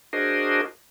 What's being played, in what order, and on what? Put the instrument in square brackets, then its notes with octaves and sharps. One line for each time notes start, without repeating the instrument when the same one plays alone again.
[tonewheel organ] D4 F#4 G#4 A#4 C5 D#5